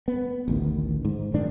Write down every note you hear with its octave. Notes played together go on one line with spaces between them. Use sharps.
B3
A1 D2 D#3
G#2
F#2 A2 D#3 D4